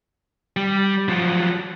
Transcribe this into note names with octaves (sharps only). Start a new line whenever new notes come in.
G3
F3 F#3